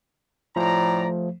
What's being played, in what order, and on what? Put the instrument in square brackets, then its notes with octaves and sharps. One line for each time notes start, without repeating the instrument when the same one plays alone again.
[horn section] A2 D5 A#5 [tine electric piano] F3 A3 C5